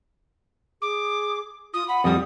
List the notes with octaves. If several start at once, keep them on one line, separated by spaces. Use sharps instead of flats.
G#4 D6
F4 D#6
F#5 B5
F2 G3 D#6